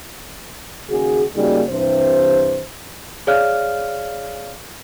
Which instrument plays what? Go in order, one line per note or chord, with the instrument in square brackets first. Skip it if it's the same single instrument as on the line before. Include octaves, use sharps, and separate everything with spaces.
[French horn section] D#2 C#3 F#4 G#4
C#3 G3 A#3 D#4 F#4 G#4
G2 C3 E3 C5
[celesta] G#4 C#5 D5 F5 F6 F#6